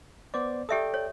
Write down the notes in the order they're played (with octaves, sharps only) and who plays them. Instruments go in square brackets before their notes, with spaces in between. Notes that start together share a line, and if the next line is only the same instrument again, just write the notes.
[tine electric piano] B3 C5 D5 [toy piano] D6
[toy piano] G4 E5 D#6 [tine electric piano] A4 D5 G5
[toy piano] C#5